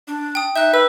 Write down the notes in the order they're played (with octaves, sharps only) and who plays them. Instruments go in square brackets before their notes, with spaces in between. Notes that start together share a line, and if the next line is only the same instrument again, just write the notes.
[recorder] D4
[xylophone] G5 D#6
[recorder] D#4 [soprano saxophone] E5 [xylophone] F#6 G6
[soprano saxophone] B4 [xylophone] E6